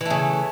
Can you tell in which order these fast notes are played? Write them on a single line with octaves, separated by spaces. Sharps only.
E3 A3 C#3